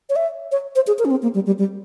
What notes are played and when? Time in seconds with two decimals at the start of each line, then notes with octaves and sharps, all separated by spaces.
0.10 C#5
0.16 E5
0.52 C#5
0.76 C5
0.87 G#4
0.99 A#4
1.05 C#4
1.11 C4
1.23 A#3
1.35 G3
1.46 G3
1.59 G3